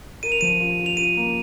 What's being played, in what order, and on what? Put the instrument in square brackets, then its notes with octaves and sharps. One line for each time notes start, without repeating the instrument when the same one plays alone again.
[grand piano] A#4 [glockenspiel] D#7
[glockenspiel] F7
[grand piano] F3 [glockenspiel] D#7
[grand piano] F4
F4
[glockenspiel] F7
[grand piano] F4 [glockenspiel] D#7
[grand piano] A#3